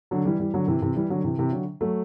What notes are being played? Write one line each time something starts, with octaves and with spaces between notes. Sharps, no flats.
D3 F#3
E3 G3
E3 G3
D3 F#3
C3 E3
C3 E3
E3 G3
D3 F#3
C3 E3
C3 E3
D3 F#3
F#3 A3